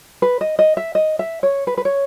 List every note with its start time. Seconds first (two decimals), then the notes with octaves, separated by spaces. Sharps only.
0.22 B4
0.41 D#5
0.59 D#5
0.77 E5
0.95 D#5
1.19 E5
1.43 C#5
1.67 B4
1.77 B4
1.85 C#5